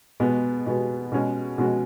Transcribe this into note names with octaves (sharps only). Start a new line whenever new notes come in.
B2 G#3 B3 F#4
B2 G#3 B3 F#4
B2 G#3 C#4 F#4
B2 G#3 C#4 F#4